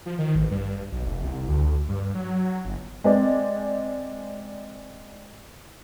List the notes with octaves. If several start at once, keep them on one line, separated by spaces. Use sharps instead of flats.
F3
D#3
A1
G2
B1
F1
C2
D2
G2
F#3
G1
G#3 C4 D5